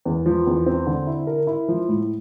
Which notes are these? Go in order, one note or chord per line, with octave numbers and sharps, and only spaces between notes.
E2
F3
E2
C4
D3
E4
A#4
E4
F3
A2